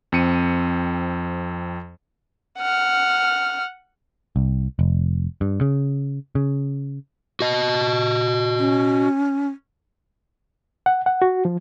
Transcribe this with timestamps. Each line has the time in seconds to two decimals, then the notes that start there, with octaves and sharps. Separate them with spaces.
0.12 F2 C4 C#7 D#7
2.58 F#5 F6
4.36 C2
4.79 F1
5.41 G2
5.61 C#3
6.35 C#3
7.40 F#4 D#5
8.59 C#4
10.86 F#5
11.06 F#5
11.22 F#4
11.45 F3